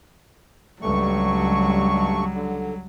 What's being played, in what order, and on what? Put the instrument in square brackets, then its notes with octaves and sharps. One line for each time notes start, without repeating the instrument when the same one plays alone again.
[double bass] C#2 G3 [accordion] G2 A3 C#6 [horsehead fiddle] F#3
[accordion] D3